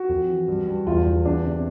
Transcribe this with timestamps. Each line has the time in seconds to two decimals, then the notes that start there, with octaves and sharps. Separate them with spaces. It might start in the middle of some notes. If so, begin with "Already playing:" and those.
Already playing: F#4
0.09 F2
0.28 E3
0.48 G2
0.67 G2
0.86 E2 F4
1.06 E2
1.24 E2 D4
1.45 C3